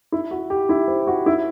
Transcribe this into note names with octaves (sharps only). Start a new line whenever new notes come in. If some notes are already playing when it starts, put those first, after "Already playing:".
E4
F#4
G4
E4
C5
F#4
E4